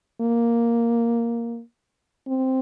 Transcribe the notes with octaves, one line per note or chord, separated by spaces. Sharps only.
A#3
C4